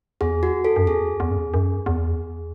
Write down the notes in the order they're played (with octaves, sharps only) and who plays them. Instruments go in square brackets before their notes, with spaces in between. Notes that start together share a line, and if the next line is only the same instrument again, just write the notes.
[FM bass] E2 [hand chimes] G#4
[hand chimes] F#4
A4
[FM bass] F#2
[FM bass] E2 [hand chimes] G#4
[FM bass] E2
F#2
E2
F#2
E2